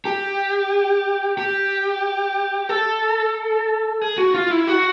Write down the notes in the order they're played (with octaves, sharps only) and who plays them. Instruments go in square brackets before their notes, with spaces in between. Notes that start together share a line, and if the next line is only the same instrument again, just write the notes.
[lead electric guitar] G4
G4
A4
G#4
F#4
F4
E4
F#4